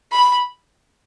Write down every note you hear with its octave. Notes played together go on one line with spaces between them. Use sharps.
B5